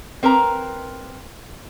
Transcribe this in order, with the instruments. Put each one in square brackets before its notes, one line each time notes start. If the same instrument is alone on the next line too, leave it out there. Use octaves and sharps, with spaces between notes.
[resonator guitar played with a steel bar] C4 A#4 B4 A#5